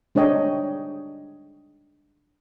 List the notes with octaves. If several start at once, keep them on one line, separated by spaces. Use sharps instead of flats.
G#3 D4 C#5 D#5 G5